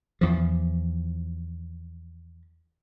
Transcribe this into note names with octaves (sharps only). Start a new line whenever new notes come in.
E2 F3